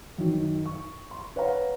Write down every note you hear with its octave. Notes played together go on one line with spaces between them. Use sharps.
F#2 D#3
C#6
C6
B4 C#5 F5 F#5 A#5